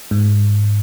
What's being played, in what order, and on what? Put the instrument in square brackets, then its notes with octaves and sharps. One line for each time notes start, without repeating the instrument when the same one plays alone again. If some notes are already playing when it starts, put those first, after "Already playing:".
[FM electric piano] G#2